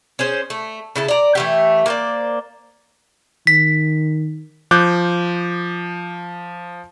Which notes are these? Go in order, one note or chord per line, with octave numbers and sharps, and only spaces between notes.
C#4 G#4 C5
A3
C#3 E4 A4
D5 A#5
E3 A3 G4
A#3 C5 D5
D#3 B6
F3 D6 F#6 G6